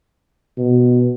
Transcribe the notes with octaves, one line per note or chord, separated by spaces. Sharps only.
B2